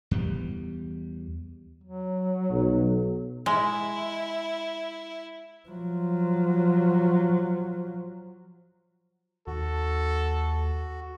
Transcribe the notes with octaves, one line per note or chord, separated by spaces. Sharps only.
E2 G3
F#3
B1
G#3 E4
F3 F#3
D#2 F#4 A4